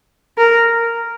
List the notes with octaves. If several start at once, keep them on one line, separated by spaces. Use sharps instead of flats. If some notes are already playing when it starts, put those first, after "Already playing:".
A#4